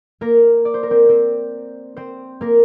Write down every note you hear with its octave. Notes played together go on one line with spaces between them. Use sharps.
A#3 A#4
D5
C5
A#4
C4 C5
C4 C5
C4 C5
A#3 A#4